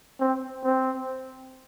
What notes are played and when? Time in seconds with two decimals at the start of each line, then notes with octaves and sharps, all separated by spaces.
0.20 C4
0.64 C4